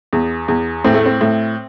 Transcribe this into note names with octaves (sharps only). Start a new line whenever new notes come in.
E2
E2
A2 C4
A3
C4
A2